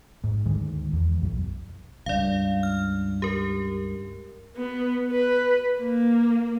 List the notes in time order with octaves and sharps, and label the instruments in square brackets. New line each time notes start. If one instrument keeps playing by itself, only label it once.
[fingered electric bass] G#2
D2 D#3 G#3
E2
B1 F#2
[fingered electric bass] C#2 G2 [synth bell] D5 F5
[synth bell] F6
G4 A#4
[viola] B3
B4
A#3